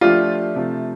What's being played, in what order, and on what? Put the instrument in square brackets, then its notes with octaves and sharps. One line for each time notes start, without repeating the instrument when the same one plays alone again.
[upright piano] F3 A3 D4 G4 [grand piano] F4
[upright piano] C3 F3 A3